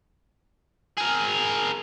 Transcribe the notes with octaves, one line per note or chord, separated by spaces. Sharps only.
G#4 A#4